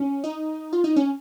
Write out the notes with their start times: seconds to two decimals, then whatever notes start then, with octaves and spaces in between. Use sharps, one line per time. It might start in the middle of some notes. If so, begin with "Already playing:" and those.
Already playing: C#4
0.24 D#4
0.73 F4
0.84 D#4
0.96 C#4